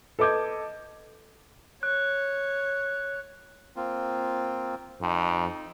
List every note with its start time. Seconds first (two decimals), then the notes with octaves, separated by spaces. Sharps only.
0.19 A4 B4 D#5 D6 G6 G#6
1.83 C#5 F#6
3.76 A#3 C4 F4
5.01 F2 D#4